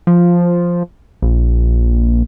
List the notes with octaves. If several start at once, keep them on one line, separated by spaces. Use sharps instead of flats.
F3
A#1